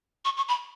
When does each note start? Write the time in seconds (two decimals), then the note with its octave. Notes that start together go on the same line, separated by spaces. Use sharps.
0.25 C#6
0.37 C#6
0.48 B5